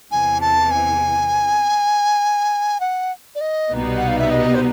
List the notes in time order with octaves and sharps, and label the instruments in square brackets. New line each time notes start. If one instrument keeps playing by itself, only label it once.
[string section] E2 C3 E3 [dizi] G#5
[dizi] A5
G#5
F#5
D5
D#5
[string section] C2 B2 G3 B3 D#4
[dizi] F#5
F5
E5
D#5
C5